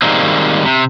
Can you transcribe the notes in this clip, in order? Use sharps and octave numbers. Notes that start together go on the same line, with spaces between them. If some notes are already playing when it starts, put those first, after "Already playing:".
D#3 G3 G#3 A#3 C4
C3